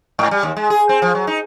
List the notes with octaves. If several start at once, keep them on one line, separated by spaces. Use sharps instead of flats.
G#2
G3
D#2
G#3
G#4
C4
F3
F#3
D#4